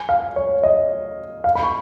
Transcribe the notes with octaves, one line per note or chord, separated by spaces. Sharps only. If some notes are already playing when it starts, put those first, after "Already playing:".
Already playing: G#5
F5
C#5
D#5
F5
B5
C#6